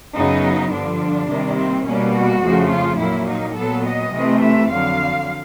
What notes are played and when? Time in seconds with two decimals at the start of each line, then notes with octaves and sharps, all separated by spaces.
0.14 F#2 C#3 F#3 B3 D#4
0.71 G2 D3 F3 D4
1.29 C3 D#3 G3 A#3
1.57 C4
1.86 B2 G3 A#3 C#4
2.14 F#4
2.43 F2 C#3 F3 A3
2.70 F4
2.99 A#2 F#3 A#3 E4
3.28 D#4
3.56 A#2 F#3 B3 A4
3.85 D#5
4.13 C3 E3 A3 C4
4.42 E5
4.70 F2 D3 F#3 F5